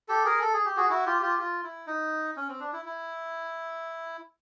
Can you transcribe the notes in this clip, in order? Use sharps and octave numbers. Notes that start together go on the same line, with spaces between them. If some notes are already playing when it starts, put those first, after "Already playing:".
G4 A4
G#4 A#4
A4
G#4
G4
F#4 G#4
E4 F#4
F4 G4
F4 G4
F4
E4
D#4
C#4
C4
D4
E4
E4